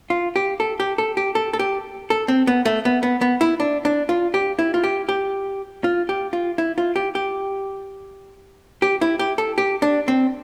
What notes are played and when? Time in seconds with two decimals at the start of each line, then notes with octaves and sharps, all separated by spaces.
0.10 F4
0.36 G4
0.60 A4
0.80 G4
0.98 A4
1.17 G4
1.35 A4
1.53 A4
1.59 G4
2.10 A4
2.28 C4
2.47 B3
2.65 A3
2.85 B3
3.03 B3
3.21 B3
3.41 E4
3.60 D4
3.85 D4
4.09 F4
4.34 G4
4.59 E4
4.74 F4
4.84 G4
5.09 G4
5.84 F4
6.09 G4
6.33 F4
6.58 E4
6.78 F4
6.96 G4
7.15 G4
8.82 G4
9.01 E4
9.19 G4
9.38 A4
9.58 G4
9.82 D4
10.08 C4